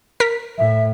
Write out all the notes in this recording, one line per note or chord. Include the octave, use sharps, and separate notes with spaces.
A#4 B6
A2 E5